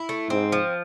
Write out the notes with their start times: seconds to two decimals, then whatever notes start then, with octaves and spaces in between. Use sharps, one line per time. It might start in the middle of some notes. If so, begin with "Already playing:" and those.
Already playing: E4
0.09 A3
0.30 G#2 C4
0.52 F3